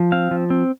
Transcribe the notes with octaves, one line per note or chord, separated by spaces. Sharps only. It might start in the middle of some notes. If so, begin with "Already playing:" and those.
Already playing: F3
C4 F5
F3
C4